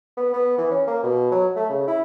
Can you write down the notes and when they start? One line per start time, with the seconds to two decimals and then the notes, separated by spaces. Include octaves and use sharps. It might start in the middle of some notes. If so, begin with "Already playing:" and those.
0.17 B3
0.34 B3
0.58 E3
0.71 C#4
0.87 A#3
1.04 B2
1.32 F#3
1.56 A3
1.70 C#3
1.87 E4